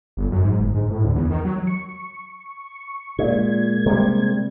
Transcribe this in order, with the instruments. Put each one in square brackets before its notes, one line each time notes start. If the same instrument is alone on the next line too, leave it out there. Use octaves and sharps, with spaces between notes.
[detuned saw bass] G1
F#2
G#2
G1
G#2
A2
D2
E2
D#3
F#3
[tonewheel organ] C#6
[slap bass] A#2 [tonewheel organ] G#3 A#3 G#6
[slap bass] C3 G3